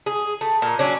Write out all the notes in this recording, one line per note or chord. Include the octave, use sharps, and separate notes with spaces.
G#4
A3
A#2
F#3 C#4 D4